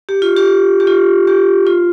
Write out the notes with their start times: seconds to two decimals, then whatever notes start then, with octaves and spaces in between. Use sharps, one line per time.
0.09 G4
0.22 F4
0.37 G4
0.80 G4
0.87 F4
1.27 G4
1.67 F4